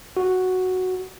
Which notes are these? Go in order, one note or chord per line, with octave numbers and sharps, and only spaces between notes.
F#4